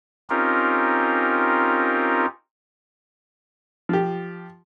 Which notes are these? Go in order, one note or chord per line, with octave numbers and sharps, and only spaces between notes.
C4 C#4 D#4 F4 G4 A#4
F3 G4